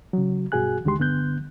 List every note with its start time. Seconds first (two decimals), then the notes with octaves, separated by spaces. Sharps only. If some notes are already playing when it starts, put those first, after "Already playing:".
0.13 C#3 F#3
0.52 G2 B2 F#4 G#4 G#5 F#6
0.85 D2 D3 D#3 G#3 G4 C6
0.99 G2 D3 B3 F#6 G6